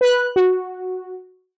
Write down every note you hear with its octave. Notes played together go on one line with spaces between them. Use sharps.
B4 F#6
F#4